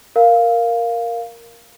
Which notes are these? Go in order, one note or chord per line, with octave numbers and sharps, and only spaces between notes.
A#4 F5